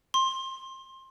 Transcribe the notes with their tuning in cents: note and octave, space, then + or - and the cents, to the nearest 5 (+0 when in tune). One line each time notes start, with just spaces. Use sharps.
C6 +20